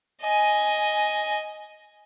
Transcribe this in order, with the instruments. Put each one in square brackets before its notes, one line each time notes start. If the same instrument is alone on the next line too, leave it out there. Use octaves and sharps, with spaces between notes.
[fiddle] D#5 G#5